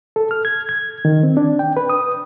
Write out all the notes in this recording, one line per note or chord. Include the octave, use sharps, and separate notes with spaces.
A4
F6
G#6
G#6
D#3
C4
D4
G5
B4
D#6